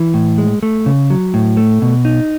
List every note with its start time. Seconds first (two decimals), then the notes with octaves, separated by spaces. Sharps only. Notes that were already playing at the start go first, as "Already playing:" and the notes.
Already playing: E3
0.14 A2
0.38 G#3
0.63 A3
0.86 C#3
1.10 F#3
1.34 A2
1.57 A3
1.82 B2
2.05 D#4